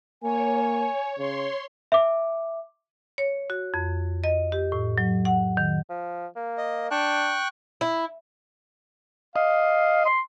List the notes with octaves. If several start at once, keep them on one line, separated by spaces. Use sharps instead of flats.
A#3 C#5 G#5
C#3 C#5 C6
E5 D6
C#5
F#4
F2
D#5
G4
A2
F#3
F#5
D#3
F3
A#3
D#5
D4 G5 C#6 F#6
E4
D#5 F5
C6